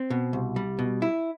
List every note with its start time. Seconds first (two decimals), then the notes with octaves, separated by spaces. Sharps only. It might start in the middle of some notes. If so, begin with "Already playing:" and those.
Already playing: C4
0.10 B2
0.33 C2
0.56 G3
0.79 B2
1.02 E4